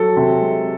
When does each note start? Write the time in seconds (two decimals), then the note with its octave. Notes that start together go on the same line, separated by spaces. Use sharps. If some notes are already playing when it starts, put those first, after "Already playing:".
Already playing: F#3 A4
0.16 C3
0.41 G#3